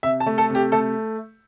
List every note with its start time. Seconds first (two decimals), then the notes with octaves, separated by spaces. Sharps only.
0.03 C3 E5
0.20 A5
0.27 A3
0.38 A4
0.50 C3
0.55 G4
0.72 A3 A4